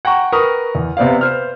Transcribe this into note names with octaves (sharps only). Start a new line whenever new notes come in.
F#5 G5 A#5 C#6
A#4 B4 C#6 D#6
E2
C3 B3 C5 D5 F5
B4 C5 F6